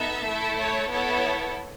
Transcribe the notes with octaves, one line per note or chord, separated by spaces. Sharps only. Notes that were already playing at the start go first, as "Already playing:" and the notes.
Already playing: B3 D#4 A4 E5
A3 E4 A4
C#5
B3 E4 A4 C#5